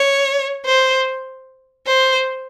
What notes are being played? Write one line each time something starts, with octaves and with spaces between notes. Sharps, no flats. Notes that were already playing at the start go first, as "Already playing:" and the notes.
Already playing: C#5
C5
C5